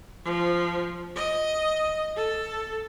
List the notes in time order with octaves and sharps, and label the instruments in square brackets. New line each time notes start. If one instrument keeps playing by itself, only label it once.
[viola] F3
D#5
A4